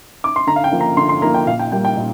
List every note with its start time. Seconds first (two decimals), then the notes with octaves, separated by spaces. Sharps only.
0.24 D6
0.36 C6
0.47 D3 A#5
0.56 F5
0.64 G5
0.72 F3 A#3
0.81 A#5
0.97 D3 C6
1.09 C6
1.22 F3 A#3 A#5
1.34 G5
1.47 A#2 F5
1.59 G5
1.72 G3 A#3 G5
1.85 G5
1.97 A#2